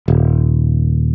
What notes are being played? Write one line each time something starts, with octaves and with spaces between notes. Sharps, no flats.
D#1